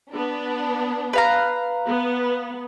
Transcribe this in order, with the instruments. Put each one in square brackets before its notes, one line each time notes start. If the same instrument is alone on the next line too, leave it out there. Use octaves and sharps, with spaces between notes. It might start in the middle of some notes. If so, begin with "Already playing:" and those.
[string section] B3 D4
[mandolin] B4 F5 A#5
[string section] B3